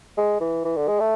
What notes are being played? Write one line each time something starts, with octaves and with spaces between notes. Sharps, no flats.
G#3
E3
E3
D3
G#3
A3